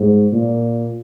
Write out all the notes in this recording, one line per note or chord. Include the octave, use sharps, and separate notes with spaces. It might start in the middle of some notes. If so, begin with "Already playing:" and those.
Already playing: G#2
A#2